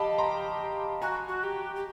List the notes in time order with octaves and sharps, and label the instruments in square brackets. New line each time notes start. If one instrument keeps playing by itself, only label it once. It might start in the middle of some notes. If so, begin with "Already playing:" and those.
Already playing: [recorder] G4 [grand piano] D#5 F5 A5 B5
[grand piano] A#5 C6
[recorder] F#4 [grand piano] G#5 A#5
[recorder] F#4
G4
G4